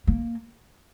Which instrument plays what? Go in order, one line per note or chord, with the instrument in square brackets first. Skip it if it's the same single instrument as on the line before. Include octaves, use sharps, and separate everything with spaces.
[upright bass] A#3